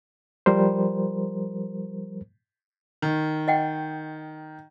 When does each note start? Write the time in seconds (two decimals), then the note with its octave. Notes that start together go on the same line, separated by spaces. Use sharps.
0.46 F3 G3 A#4 C5
3.02 D#3
3.48 D#5 F#5 G5